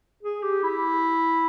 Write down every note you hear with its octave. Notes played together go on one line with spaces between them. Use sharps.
G#4
G4
E4